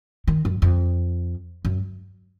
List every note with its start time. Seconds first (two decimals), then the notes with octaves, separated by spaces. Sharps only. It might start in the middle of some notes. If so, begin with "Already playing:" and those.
0.27 D#3
0.45 F#2
0.62 F2
1.65 F#2